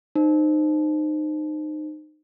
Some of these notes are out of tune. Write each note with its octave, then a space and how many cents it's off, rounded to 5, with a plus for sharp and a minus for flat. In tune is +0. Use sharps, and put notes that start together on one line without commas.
D#4 -25 C5 +0